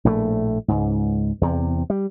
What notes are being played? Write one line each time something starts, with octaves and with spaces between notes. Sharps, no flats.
A#1 A2 D3 A3
C#2 G#2
E2 C3
G3